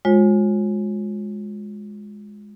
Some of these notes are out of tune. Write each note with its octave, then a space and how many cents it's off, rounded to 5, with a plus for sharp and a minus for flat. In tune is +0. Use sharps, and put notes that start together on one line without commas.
G#3 +0 F4 +35 C#5 -40